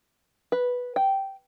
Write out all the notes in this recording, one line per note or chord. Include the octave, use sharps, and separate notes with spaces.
B4
G5